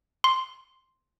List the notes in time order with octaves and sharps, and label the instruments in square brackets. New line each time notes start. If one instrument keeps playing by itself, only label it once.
[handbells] C6